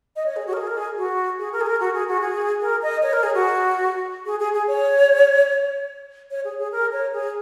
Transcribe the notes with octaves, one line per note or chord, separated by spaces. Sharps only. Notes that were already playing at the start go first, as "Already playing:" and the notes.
D#5
C#5
G#4
F#4
A#4
G#4
A#4
G#4
F#4
G#4
A#4
G#4
A#4
F#4
G#4
F#4
G#4
A#4
D#5
C#5
A#4
G#4
F#4
G#4
G#4
G#4
C#5
C#5
G#4
G#4
A#4
C#5
G#4